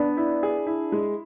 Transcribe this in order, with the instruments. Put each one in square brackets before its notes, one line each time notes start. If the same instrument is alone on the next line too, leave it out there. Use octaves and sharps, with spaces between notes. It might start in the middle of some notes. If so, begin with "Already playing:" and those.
Already playing: [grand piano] B3 [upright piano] D4
[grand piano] E4
G#4
E4
G#3